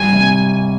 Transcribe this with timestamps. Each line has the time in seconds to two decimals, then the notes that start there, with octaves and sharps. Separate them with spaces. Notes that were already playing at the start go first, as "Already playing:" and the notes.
Already playing: G#1 G3 G#5
0.13 C3